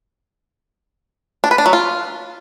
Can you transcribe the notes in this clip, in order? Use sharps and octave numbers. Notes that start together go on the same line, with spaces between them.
D4
B4
D4
F#3
F4